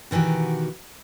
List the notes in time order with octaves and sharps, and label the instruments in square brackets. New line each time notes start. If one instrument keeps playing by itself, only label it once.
[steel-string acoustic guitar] B2 D#3 E3 F#4 G4